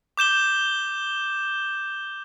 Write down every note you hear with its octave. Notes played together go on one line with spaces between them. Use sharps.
D6 G6 E7 G7